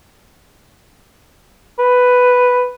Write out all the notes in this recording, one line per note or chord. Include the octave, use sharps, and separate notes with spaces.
B4